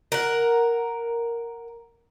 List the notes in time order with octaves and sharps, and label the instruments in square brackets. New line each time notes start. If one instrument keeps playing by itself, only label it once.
[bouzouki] A#4 F#5